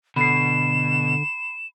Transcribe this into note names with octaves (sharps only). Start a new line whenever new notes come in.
B2 D3 B5 C7 E7